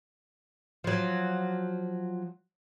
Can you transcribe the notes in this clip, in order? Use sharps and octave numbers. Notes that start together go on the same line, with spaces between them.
F3 F#3